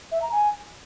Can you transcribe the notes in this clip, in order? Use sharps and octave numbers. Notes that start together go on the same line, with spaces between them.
E5
A#5
G#5